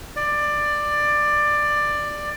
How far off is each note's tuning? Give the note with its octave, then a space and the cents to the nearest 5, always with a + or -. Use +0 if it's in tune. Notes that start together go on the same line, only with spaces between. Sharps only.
D5 +15